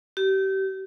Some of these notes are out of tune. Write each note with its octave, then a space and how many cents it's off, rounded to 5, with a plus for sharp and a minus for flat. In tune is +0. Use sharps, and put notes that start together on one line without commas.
G4 -30